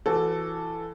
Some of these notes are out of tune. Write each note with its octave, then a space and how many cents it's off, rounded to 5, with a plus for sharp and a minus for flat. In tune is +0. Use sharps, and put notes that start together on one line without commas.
E3 +20 F#4 -10 A4 +0